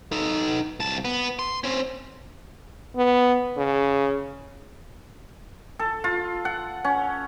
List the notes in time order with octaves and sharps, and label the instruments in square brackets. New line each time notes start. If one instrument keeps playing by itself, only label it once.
[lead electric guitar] D#4 A4
C2 A5
B3
C6
C4 C#4
[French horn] B3
C#3
[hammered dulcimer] A4
F4
F#5
C#4